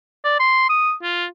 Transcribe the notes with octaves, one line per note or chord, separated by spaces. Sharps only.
D5
C6
D#6
F4